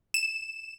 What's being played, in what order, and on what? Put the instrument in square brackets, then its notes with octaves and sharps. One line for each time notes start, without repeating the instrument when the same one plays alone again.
[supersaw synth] E7